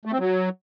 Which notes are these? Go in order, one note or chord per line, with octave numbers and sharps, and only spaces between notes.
A3
C4
F#3